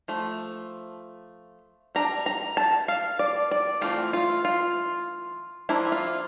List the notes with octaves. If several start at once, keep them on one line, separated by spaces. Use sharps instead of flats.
F3 A3
G3 D4 A#5
A#5
A5
F5
D5
D5
E3 A3 C4 F4
F4
F4
F3 A#3 D4 E4
F4